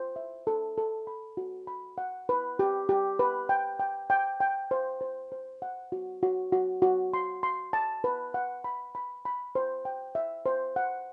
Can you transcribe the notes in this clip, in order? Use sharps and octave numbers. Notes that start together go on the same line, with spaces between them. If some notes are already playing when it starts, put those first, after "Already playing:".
Already playing: C5
E5
A4
A4
B5
F#4
B5
F#5
B4
G4
G4
B4
G5
G5
G5
G5
C5
C5
C5
F#5
F#4
F#4
F#4
F#4
C6
C6
A5
B4
F#5
B5
B5
B5
C5
G5
E5
C5
F#5